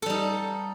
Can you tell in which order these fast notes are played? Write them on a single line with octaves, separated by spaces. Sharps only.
A4 G3 D#4